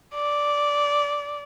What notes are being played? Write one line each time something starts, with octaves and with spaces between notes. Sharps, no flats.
D5